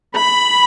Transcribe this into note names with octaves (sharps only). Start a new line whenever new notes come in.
B5